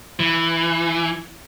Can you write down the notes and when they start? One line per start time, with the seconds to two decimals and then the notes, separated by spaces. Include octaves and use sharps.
0.20 E3